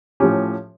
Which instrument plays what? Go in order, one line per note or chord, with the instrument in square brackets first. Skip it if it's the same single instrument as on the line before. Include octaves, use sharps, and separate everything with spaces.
[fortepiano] A2 F3 C#4 G4